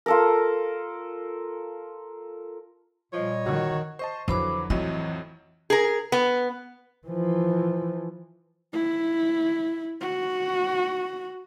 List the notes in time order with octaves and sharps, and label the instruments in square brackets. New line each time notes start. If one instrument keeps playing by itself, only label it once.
[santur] F4 A4 A#4
[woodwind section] A#2 G3 D#5 [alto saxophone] F3 [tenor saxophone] C#5
[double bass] D#3 [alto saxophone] F#4
[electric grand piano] C5 D#5 A5 [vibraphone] C#6
[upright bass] F2 [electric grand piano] D3 E3 F#3 [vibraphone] C5 B5 D6
[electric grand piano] F2 A2 F#3 [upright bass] E3 [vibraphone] D#5
[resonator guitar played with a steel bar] G#4 A#4
B3
[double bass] E3 F3
[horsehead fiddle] E4
F#4